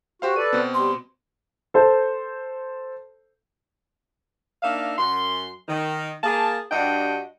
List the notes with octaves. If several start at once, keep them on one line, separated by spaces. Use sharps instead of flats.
F#4 G4 C5 F5
A4 B4 D5 D#7
B2 C4
G3 C6
A4 C5
A#3 D4 D#4 E5 F5
F#2 C6
D#3
A#3 G#4 A5
G2 D4 F#4 G4 D#5 G5